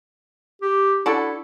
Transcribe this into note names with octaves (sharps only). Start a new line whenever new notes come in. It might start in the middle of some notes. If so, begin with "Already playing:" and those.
G4
D4 E4 F#4 A4